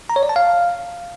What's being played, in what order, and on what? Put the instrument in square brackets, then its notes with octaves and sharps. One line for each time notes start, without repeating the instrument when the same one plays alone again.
[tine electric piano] A#5
C#5
D5
A5
F5